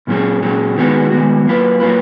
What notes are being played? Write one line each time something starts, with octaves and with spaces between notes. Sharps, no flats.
A#2 F#3 C#4 G#4
A#2 F#3 C#4 G#4
D#3 G#3 B3 F#4
D#3 G#3 B3 F#4
F#3 A#3 F4 B4
F#3 A#3 F4 B4